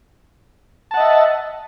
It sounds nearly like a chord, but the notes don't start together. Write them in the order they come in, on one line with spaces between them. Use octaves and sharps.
A5 F#5 D#5 E5